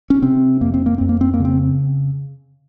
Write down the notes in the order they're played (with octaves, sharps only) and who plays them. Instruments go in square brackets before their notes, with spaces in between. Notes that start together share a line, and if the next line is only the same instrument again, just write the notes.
[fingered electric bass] C#4
C3 C4
F2 A#3
C4
A#3
F2 C4
A#3
C4
A#3
C#3 C4